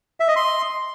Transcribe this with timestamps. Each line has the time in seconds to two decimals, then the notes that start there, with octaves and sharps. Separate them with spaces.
0.20 E5
0.28 D#5
0.36 C6